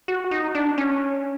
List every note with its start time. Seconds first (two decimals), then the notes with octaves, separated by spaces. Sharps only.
0.08 F#4
0.31 D#4
0.55 D4
0.78 C#4